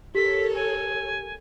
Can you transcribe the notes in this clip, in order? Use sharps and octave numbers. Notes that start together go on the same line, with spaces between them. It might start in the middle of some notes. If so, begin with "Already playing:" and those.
G4 A4 A#4 C#5 B6
G#5